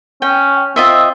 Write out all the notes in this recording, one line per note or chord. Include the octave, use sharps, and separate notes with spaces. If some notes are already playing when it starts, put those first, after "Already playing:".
C#4 G5
C4 F4 D#5 E5